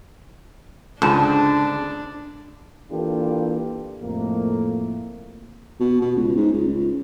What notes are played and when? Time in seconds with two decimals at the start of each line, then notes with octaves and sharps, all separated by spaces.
1.02 C#2 G#2 D3 D4 A5
2.91 E3 A#3 D4 F4 G4 A4
4.02 F2 A2 A3 A#3
5.80 B2
6.01 B2
6.16 C#2
6.36 G#2
6.53 C#2
6.67 C#2